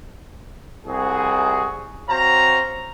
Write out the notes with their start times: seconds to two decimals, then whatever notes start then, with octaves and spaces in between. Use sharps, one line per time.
0.86 C2 C3 F#4 G#4
2.09 C4 F#4 C5 C#5 F5 A#5